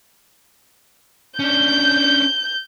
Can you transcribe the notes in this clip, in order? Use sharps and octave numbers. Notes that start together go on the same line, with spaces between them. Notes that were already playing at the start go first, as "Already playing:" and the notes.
C#4 D4 G6